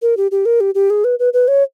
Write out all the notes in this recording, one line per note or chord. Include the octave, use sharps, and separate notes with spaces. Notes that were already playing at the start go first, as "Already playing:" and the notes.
A#4
G4
G4
A#4
G4
G4
G#4
B4
B4
B4
C#5